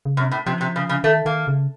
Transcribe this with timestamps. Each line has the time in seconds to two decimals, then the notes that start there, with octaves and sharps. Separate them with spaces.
0.05 C#3
0.17 F#2 C3
0.31 A2
0.46 C3 F3
0.61 C3
0.76 C#3
0.89 C#3
1.04 D#3 A3
1.25 D#3 A#3
1.47 C#3